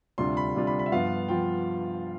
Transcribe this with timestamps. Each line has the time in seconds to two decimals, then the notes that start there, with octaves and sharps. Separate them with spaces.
0.18 D2 C3 G3 D4 F4 C6
0.37 B5
0.55 D2 C3 G3 D4 F4
0.67 B5
0.79 B5
0.86 E5
0.92 G2 F3 B3 F4 F5
1.28 F3 B3 F4 G5